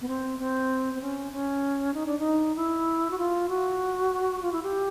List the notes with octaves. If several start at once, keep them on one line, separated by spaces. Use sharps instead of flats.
B3
C4
C4
C4
C#4
C#4
D#4
D4
D#4
E4
F#4
F4
F#4
F4
E4
G4